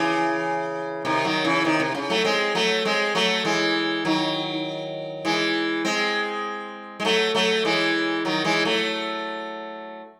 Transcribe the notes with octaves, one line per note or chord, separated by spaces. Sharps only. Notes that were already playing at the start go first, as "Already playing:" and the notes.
Already playing: C#3 E3
C3 D#3
D#3 F#3
C#3 E3
C3 D#3
C3
C#3
F#3 A3
G#3 C4
F#3 A3
G#3 C4
F#3 A3
E3 G#3
D#3 F#3
E3 G#3
G#3 C4
G#3
F#3 A3
F#3 A3
E3 G#3
D#3 F#3
E3 G#3
F#3 A3